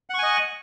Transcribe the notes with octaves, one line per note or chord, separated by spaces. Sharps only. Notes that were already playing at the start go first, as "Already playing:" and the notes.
D#5 F#5 G#5 C#6